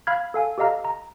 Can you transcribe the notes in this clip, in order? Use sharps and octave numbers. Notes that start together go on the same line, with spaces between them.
F5 B5 F6 G#6
A4 F5 G#5
G4 A4 D#5 F5 A#5 F6
A#5